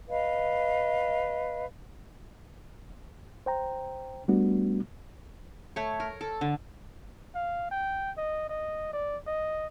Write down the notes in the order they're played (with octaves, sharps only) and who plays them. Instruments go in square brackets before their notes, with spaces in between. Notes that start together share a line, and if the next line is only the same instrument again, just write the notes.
[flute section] B4 D#5 F5
[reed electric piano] C5 G5 A#5
G3 A3 B3 D4 F#4
[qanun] A3 C#5
A#4
A4
D3
[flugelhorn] F5
G5
D#5
D#5
D5
D#5